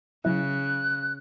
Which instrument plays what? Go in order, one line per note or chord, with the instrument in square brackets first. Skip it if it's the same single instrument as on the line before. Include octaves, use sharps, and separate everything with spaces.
[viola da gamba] C#3 [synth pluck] F#3 E4 [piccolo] F#6